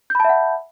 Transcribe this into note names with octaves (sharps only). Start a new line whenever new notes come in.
E5 F#5 A5 B5 G6